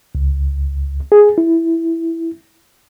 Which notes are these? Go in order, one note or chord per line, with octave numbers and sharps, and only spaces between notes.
C#2
G#4
E4